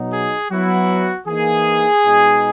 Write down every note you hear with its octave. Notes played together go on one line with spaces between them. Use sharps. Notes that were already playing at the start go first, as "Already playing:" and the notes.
Already playing: B2 F#3 B3 D#4
G#4
F#3 B3 E4 F#4
E3 A#3 D#4 G#4
B2 G#3 D#4